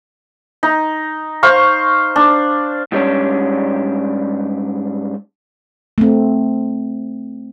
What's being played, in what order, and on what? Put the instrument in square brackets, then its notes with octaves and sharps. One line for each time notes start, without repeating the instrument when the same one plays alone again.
[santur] D#4
C5 F5 C#6
D4
[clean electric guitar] G#2 G3 C#4 D4
[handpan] A3 C4